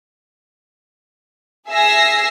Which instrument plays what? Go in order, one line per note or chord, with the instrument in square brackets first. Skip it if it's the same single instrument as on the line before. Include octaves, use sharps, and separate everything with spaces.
[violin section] G#4 E5 G#5 E6 A#6 C7